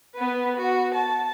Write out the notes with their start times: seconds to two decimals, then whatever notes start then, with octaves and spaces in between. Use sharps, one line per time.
0.15 B3 B4
0.56 F#4
0.95 A5